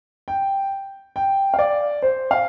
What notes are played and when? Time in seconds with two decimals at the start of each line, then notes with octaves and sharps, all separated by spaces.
0.28 G5
1.16 G5
1.54 F5
1.59 D5
2.02 C5
2.31 F5